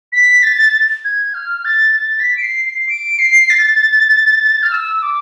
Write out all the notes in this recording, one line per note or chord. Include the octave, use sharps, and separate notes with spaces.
B6
A6
G#6
F6
A6
A6
B6
D7
C7
C7
D7
C7
A6
F6
E6
D6